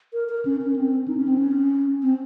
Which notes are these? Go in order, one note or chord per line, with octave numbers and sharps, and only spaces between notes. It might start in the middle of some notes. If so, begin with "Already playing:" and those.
A#4
A#4
C#4
C#4
C4
D#4
C#4
C4
C#4
C4